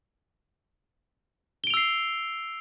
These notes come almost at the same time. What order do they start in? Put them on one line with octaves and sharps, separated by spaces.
G7 D7 F7 E6 C7